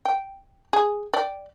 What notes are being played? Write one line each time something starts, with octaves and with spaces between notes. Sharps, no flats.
G5
G#4
D5 G5